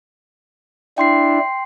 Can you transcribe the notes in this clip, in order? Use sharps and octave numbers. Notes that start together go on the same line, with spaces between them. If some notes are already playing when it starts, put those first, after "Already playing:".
D4 E4 G5 C6 C7